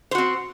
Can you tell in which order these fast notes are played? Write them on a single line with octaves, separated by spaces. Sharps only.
C5 F#4 C4